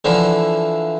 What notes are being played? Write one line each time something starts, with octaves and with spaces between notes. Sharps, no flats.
D3 E3 F3